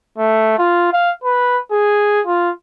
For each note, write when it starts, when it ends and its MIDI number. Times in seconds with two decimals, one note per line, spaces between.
0.18 0.54 57
0.58 0.92 65
0.93 1.12 77
1.24 1.59 71
1.71 2.21 68
2.26 2.50 65